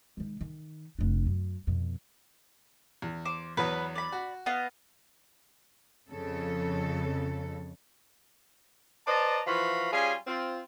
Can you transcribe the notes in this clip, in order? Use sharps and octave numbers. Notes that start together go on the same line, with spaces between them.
D#3 G#3
D#3
F1 D4
F#2
F2 B2
E2
C5 D6
E2 F#3 B3 B4
D5 B5
F#4
B3 D#5 F5
F2 C#3 A4
B4 C5 D5 D#5 A5 A#5
E3 F3 F4 F#4 F5 B5
G3 C#4 F4 G#4 G#5
C4 F4